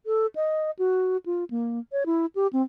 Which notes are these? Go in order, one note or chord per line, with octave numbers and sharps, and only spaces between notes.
A4
D#5
F#4
F4
A#3
C#5
E4
G4
C4